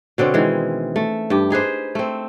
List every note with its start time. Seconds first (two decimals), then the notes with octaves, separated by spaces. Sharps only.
0.18 B2 D3 C4 C#4
0.34 D#3 E3 G#3
0.96 A3
1.30 G2 G4
1.50 D#4 G#4 B4 C5
1.95 A3 C4